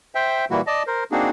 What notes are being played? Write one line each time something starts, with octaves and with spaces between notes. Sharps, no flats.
C5 E5 G5
A#2 E3 G3 A#3 E4 F#4
D5 D#5 A5
A#4 C5
A#3 C4 D4 D#4 F#4 G#4